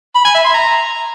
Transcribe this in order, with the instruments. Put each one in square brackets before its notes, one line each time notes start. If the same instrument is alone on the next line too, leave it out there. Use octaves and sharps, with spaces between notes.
[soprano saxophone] B5
G#5
E5
C6
A#5